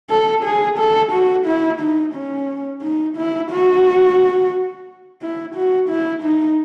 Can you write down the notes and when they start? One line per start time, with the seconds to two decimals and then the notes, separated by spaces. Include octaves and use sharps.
0.10 A4
0.44 G#4
0.79 A4
1.12 F#4
1.47 E4
1.81 D#4
2.15 C#4
2.82 D#4
3.17 E4
3.52 F#4
5.22 E4
5.56 F#4
5.90 E4
6.23 D#4